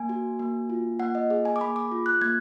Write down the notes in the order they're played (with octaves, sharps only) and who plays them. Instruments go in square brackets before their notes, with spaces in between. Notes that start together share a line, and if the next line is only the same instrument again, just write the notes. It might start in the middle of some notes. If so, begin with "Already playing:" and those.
Already playing: [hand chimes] A#3 G#5
F#4
A#3
F4
A#3 F#5
D#5
G#4
G#5
D6
A#3 B5
D6
F4
F#6
A#3 G#6